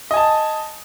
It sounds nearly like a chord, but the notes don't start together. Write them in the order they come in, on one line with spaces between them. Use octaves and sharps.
D#5 G#5 A5